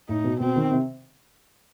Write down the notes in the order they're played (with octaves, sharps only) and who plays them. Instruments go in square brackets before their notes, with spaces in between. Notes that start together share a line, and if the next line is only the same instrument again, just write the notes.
[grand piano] A2 [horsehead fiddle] D#4
[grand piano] B2
[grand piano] B2 [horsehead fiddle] C4
[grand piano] D#3
C3